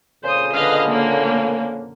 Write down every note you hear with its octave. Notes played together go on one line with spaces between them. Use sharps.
F2 A#2 C#3 C5 D#6
D3 B4 D#5 F5
A#3